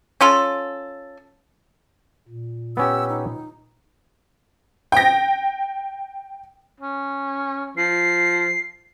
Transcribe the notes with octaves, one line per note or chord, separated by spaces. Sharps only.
C#4 F4 A4
A#2
B3 C#4 G4 E6
D#4
G5 A#6
C#4
F3 C7